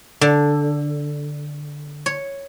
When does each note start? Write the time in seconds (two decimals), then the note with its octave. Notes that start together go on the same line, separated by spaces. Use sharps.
0.21 D3
2.06 C#5